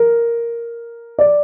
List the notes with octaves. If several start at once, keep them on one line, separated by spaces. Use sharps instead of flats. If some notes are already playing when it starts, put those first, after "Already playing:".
Already playing: A#4
D5